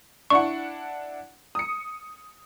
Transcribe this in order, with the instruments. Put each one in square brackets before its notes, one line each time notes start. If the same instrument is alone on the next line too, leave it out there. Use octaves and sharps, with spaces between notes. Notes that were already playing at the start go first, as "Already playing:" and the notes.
[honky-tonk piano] D4 E4 F#5 [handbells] C#6
[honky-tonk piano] D#6 C#7